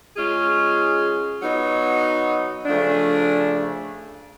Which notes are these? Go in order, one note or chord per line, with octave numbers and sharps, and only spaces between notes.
G#3 C#4 F4 G#4
F#3 B3 D#4
C#3 F3 A3 D4